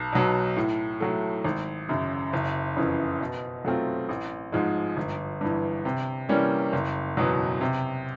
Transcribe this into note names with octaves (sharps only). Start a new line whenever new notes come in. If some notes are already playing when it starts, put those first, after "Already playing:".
Already playing: B1
B2 F#3
A2
F#3 A3
G#1
F#2 C#3
F#1
F2 C#3 E3
B2
F#3 A3 C4 F4
A1
G#2 F3 G#3
G1
G2 E3
C3
E3 G3 A#3 C#4
F#1
E2 B2 F#3
C3